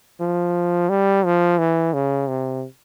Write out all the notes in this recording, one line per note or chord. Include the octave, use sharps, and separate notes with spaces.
F3
G3
F3
E3
C#3
C3